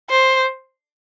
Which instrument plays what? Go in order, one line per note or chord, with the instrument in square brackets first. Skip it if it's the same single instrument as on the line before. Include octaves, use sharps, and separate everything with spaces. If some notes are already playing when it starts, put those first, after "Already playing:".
[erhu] C5